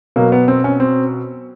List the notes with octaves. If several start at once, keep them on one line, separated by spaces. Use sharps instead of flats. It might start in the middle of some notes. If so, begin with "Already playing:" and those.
B2 F#3 A#3
B3
C4
C#4
C4